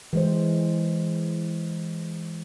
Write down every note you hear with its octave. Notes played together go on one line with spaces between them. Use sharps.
E3 G#3 C5